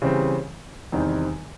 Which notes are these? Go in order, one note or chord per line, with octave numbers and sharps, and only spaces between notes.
C#3 E3 G3 C4
E2 C3 D#3 G3 C4